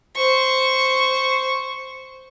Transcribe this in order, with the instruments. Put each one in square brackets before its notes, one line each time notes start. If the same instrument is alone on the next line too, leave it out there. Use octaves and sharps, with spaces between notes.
[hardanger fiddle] C5 C#6